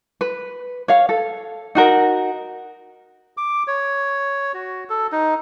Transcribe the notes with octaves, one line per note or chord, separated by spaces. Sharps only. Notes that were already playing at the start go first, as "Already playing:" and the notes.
B4
C#5 F5
A4
D#4 F#4 A#4
D6
C#5
F#4
A4
D#4